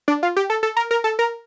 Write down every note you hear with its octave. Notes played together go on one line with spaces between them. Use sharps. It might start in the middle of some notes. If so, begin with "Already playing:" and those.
D4
F4
G4
A4
A4
A#4
A#4
A4
A#4